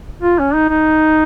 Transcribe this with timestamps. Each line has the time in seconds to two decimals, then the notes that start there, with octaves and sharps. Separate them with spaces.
0.23 F4
0.39 C#4
0.54 D#4
0.70 D#4